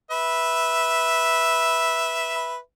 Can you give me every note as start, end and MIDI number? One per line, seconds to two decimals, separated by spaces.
0.11 2.58 71
0.11 2.58 76